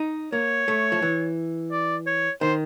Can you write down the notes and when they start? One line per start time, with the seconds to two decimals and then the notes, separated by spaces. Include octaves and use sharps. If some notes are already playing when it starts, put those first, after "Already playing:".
Already playing: D#4
0.33 A#3 C#5
0.68 A3
0.92 F3
1.02 E3
1.72 D5
2.06 C#5
2.41 D#3 C5